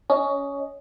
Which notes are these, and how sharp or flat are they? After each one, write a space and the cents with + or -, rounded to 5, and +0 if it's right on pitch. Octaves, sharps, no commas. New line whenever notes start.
C#4 +15 D#5 +0